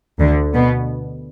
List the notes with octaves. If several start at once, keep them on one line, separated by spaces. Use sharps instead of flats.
D2 D3
B2 B3